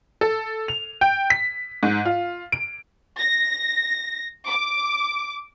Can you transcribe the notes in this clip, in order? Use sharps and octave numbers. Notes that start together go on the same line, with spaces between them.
A4
F7
G5
B6
G#2
F4
D7
A#6
D6